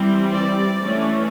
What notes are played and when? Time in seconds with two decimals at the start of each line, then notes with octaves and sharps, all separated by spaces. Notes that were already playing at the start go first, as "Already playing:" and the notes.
Already playing: E3 G3 C4
0.32 D5
0.82 E3 A3 C#4